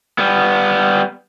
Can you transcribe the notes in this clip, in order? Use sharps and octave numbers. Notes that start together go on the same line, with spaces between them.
G3 B3